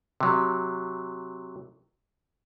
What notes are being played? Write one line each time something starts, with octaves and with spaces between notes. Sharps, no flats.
C3 F#3